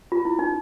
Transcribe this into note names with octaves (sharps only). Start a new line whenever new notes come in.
F4
E4
D#4